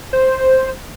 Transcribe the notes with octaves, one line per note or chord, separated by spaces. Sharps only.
C5